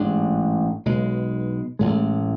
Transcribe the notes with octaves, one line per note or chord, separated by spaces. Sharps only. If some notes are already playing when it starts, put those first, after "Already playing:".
Already playing: A1 G#2 G#3 D4
B1 B2 G#3
A1 A2 G#3